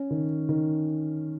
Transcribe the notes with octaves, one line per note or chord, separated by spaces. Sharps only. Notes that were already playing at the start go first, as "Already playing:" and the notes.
Already playing: C#4
D#3
D#3